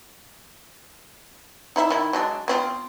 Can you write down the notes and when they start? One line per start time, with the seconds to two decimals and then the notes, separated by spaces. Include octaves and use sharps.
1.76 D#4 E4 E5
1.90 D#3 E4
2.13 F#3 G#3 D4
2.48 B3 C4 F4